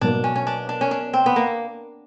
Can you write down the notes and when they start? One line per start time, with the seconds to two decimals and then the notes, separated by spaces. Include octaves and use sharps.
0.01 B2 F#3 A#3 D4
0.24 C#4
0.36 C#4
0.47 D4
0.69 D4
0.81 C#4
0.91 D4
1.13 C4
1.26 B3
1.36 A#3